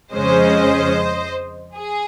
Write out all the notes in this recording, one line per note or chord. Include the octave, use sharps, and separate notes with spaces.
F2 C#3 G#3 C#4 C5 D#5
G#4